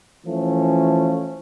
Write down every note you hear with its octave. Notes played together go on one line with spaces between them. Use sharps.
E3 F3 A3 C#4